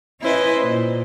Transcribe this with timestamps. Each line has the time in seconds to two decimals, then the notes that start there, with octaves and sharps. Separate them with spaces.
0.21 C#4 E4 B4 C5 D#5
0.61 A#2